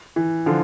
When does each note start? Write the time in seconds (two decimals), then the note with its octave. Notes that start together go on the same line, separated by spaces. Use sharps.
0.16 E3
0.46 D3 F3